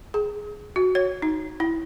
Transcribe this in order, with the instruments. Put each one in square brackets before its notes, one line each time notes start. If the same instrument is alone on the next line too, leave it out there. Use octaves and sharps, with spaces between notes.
[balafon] G#4
F#4
C#5
D#4
E4